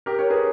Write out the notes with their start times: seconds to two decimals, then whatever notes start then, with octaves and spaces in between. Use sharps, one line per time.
0.06 G4 A#4
0.19 A#4 C#5
0.30 G#4 B4